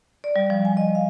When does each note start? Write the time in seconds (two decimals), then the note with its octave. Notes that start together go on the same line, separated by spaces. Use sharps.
0.24 D5
0.36 G3
0.50 F3
0.65 G#5
0.77 D#5
0.95 F5